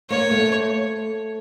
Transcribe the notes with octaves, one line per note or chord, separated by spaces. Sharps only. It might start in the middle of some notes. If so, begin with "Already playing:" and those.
A#3 C#5
A3